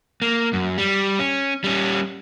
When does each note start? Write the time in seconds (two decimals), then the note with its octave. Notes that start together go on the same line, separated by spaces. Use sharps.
0.22 A#3
0.53 F#2
0.78 G3
1.19 C#4
1.64 G3 C#4